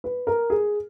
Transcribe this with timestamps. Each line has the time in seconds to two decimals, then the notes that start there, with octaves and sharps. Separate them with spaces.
0.04 B4
0.27 A#4
0.50 G#4